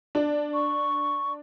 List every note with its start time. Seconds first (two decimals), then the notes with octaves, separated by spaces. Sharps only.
0.15 D4
0.54 C#6